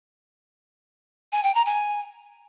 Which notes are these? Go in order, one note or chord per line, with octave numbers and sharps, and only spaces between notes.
G#5
G5
A#5
G#5